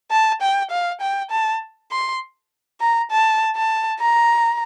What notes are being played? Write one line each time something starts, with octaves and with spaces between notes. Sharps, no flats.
A5
G5
F5
G5
A5
C6
A#5
A5
A5
A#5